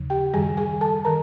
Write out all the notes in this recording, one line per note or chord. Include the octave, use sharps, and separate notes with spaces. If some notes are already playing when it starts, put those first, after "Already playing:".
Already playing: D#2 C#3 F3
G4 G5
F#2 D#3 G3 G#4 G#5
G#4 G#5
A4 A5
D#3 A#4 A#5